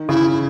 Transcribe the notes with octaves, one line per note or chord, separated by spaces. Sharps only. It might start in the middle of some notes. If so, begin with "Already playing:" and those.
Already playing: D#3
C#3 E4
E4